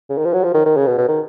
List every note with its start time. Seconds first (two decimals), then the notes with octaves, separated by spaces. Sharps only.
0.10 C#3
0.18 D#3
0.25 F3
0.33 F#3
0.44 F3
0.54 D#3
0.66 D#3
0.77 C#3
0.87 B2
0.98 B2
1.08 D#3